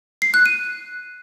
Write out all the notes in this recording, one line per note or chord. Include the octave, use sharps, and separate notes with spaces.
C7
F#6
D#7